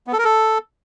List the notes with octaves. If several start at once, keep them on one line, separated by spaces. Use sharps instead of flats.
B3
A4
A#4
A4